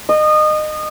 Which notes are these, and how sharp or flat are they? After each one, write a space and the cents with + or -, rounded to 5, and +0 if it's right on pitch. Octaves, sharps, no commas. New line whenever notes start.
D#5 -25